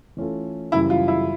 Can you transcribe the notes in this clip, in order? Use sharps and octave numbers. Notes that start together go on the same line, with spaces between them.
E3 A3 C#4 F4 A4
F#2 C#3 E3 G3 E4
F4
E4